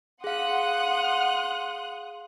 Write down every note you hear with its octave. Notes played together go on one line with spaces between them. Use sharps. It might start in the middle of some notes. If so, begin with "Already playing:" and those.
G#4 F5 F#5 C6 D#6 F#6